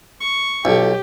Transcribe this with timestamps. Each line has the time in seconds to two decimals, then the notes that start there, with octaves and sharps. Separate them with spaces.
0.21 C#6
0.65 B1 F4 G4 A4